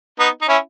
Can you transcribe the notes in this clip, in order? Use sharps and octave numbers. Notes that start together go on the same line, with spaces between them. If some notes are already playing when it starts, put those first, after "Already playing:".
B3 D#4
D#4
C#4 E4